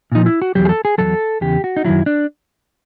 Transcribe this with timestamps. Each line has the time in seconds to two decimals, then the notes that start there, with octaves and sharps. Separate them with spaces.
0.12 A#2 F3 D#4
0.26 E4
0.42 F#4
0.55 E2 B2 F#3 G4
0.65 G#4
0.69 A4
0.85 G#4
0.98 E2 B2 F#3 A4
1.41 E2 C#3 G4
1.64 F#4
1.77 D#4
1.85 F#2 D#3 F#3 E4
2.06 D4